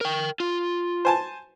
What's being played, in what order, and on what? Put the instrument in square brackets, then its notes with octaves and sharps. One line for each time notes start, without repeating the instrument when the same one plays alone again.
[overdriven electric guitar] A#4 G5
F4
[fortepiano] C5 G#5 A5